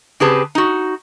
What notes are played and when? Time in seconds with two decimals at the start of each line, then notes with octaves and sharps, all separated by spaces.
0.20 C#3 C4 G4 G#4 B4 A5
0.55 D#4 F#4